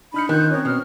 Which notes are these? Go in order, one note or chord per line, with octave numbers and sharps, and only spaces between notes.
D4 D#4 B5 F6 C#7
D#3 F4 F#6 G6
C4 C#4 D#4 A#4 C#5
B2 F6